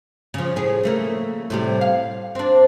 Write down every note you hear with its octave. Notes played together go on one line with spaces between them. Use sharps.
C#3 F3
A2 G#4
C#3 A3 A#3
A2 C3 G3
F5
C4 D4